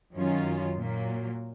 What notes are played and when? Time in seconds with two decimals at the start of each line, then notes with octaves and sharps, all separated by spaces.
0.14 F#2 D#3 F#3 C#4 F4
0.77 A#2 F#3 A#3